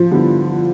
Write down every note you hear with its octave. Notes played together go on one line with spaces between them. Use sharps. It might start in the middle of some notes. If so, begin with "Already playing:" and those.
Already playing: F3
D3 G3 B3 E4